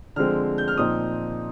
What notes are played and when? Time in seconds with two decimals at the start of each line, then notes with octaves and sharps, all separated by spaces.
0.16 D3 F3 G#3 C4 F6
0.58 G6
0.68 F6
0.77 A#2 F3 C4 D#4 D#6